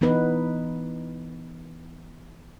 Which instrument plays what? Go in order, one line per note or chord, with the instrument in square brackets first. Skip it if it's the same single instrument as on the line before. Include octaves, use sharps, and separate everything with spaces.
[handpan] E3 B3 D#4 B4